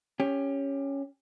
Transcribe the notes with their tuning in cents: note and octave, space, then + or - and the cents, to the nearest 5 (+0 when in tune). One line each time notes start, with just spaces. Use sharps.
C#4 +0 G4 +20